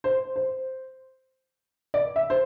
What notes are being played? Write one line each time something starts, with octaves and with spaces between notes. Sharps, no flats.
C5
C5
D5
E5
C5